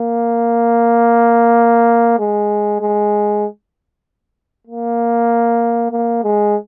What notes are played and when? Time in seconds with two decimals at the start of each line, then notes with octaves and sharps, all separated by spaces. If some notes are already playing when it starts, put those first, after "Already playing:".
Already playing: A#3
2.19 G#3
2.81 G#3
4.67 A#3
5.91 A#3
6.23 G#3